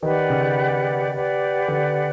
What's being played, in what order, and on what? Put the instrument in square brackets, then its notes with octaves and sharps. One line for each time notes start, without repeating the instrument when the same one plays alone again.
[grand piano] D#3 [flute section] G4 B4 D5 F#5
[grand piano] C#3
[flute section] G4 B4 D5 F#5
[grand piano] D3